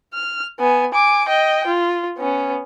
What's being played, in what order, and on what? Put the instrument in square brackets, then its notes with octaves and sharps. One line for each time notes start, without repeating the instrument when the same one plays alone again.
[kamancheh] F6
B3 G#5
G#5 D6
D#5 G5
F4
B3 C#4